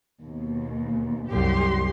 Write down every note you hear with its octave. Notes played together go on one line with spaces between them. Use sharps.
D#2 B2
C2 F#2 G4 C6